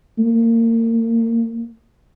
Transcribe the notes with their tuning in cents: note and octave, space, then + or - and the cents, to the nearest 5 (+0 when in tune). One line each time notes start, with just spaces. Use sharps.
A#3 -30